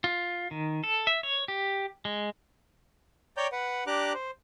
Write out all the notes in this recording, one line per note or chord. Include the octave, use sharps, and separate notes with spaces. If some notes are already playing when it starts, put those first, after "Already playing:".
F4
D#3
A4
E5
C#5
G4
G#3
C#5 D5 G5 A#5 G6
B4 F#5
D4 G4 A#5 D6 F#6
C5